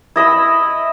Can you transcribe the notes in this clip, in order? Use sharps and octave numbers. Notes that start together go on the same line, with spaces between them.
E4 D#5 B5 E6